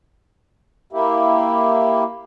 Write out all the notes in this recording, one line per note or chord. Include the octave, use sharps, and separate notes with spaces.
A#3 E4 G4